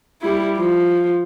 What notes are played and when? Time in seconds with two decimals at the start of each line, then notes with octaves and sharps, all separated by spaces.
0.21 G3 E4
0.58 F3